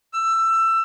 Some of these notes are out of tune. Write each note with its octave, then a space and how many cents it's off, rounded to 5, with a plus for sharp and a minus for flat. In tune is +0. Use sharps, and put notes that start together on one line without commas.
E6 +20